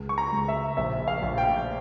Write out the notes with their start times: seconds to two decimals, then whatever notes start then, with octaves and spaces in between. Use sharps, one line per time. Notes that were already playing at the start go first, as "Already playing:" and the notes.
Already playing: C#2
0.09 C#6
0.18 A#5
0.32 C#2
0.48 E5
0.77 A#1 E5
1.08 F5
1.22 A#1
1.38 G5